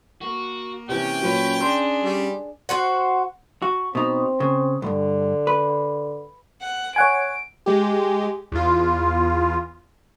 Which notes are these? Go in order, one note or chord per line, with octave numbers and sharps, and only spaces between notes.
A#3 F#4
C3 E3 C#4 G5
A#2 F#3 B4 C#5
D4 G#4 C6
G3
F#4 C5 F#5
F#4
B2 C4 D#4
C#3
B1 G2 D3
B4
F#5
C#5 F#5 G#5 D7
G#3 G4
E2 F4